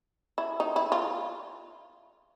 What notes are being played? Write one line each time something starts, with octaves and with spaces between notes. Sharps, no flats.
E4
D#4
E4
F4